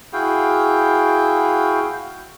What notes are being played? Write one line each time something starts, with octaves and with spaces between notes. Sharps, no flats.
E4 F#4 G#4 F5 G5